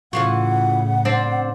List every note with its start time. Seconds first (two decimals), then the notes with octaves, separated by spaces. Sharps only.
0.13 A2 C#3 E3 F4 F#4 F#5
1.05 C4 D4 D5